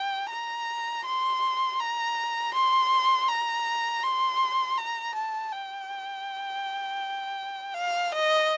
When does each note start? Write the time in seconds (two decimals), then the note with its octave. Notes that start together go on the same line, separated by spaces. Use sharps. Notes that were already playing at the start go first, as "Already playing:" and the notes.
Already playing: G5
0.30 A#5
1.05 C6
1.80 A#5
2.54 C6
3.28 A#5
4.03 C6
4.77 A#5
5.15 A5
5.52 G5
7.74 F5
8.12 D#5